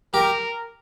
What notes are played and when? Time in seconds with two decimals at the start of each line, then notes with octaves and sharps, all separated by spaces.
0.14 G4 A#4